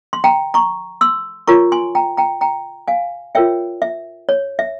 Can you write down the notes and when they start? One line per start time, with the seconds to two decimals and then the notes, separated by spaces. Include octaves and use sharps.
0.13 C6
0.24 G5 A#5
0.54 A#5 C#6
1.01 C6 E6
1.47 F4 A#4 C#5 A#5 C#6
1.72 G#5 C6
1.95 G5 A#5
2.17 G5 A#5
2.41 G5 A#5
2.88 F5 G#5
3.35 F4 A#4 C#5 E5 G5
3.82 E5
4.29 C#5
4.59 E5